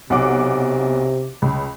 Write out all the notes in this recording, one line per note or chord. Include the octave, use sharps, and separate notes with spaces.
B1 C3 F#5 D6
C#2